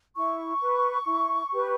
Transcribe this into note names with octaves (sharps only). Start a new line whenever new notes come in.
E4 C#6
B4
E4
G4 B4